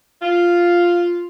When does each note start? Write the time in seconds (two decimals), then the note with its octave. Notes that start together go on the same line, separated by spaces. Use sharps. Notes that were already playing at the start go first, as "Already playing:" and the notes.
0.22 F4